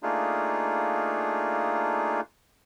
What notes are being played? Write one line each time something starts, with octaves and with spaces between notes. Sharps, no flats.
A3 A#3 D4 D#4 F4 G#4